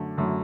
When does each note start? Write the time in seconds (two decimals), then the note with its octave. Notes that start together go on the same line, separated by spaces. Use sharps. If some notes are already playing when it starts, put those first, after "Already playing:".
Already playing: F#2 D3 A3
0.17 F#2 D3 A3